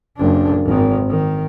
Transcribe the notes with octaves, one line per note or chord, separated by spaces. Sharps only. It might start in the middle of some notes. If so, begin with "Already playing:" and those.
F#1 D4
G#1 D#3
D#3